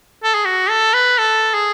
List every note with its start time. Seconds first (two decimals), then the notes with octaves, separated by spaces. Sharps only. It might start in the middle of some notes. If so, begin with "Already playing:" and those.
0.24 A4
0.34 G#4
0.45 F#4
0.69 A4
0.94 B4
1.18 A4
1.54 G#4